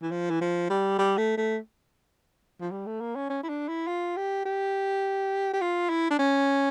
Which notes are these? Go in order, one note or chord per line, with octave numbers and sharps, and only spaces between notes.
E3
F3
E3
F3
G3
G3
A3
A3
F3
G3
A3
A#3
C#4
C#4
E4
D4
E4
F4
G4
G4
G4
F4
E4
D4
C#4